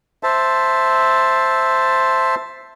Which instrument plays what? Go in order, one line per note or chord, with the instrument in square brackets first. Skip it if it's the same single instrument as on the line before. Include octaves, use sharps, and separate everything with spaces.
[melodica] C5 E5 A5